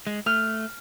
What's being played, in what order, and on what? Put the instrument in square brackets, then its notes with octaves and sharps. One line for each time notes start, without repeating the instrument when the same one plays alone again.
[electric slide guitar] G#3
[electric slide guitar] A3 [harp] F6